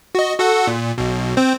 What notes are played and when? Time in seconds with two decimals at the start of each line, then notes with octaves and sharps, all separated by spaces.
0.15 F#4 D#5
0.39 F#4 A4 F#5
0.67 A#2
0.98 B1 B2
1.37 C4 C5